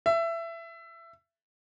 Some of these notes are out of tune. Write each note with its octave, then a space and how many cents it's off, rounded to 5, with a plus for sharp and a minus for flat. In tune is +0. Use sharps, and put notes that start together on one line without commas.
E5 +20